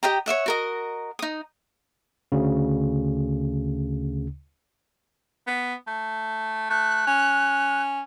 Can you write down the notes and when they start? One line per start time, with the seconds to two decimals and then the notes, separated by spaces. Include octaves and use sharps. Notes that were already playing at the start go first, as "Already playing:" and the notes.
0.03 G4 D#5 G5 A#5
0.26 C#5 D5 E5 F#5
0.46 F#4 A#4 D#5
1.19 D#4 D#6
2.32 D2 C#3
5.47 B3
5.88 A3
6.70 A3 F#6
7.07 C#4